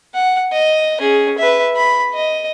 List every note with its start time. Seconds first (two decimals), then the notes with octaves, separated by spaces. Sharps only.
0.14 F#5
0.52 D#5
1.00 C#4 G#4
1.38 B4 E5
1.76 B5
2.14 D#5